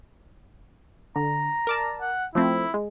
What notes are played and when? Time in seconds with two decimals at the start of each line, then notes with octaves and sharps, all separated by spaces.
1.16 D3 A#5
1.67 A#4 D5 A5
2.02 F#5
2.35 F3 A3 C4 E4
2.74 G#3